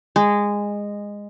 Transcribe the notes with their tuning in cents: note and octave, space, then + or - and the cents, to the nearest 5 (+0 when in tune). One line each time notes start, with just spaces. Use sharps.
G#3 -15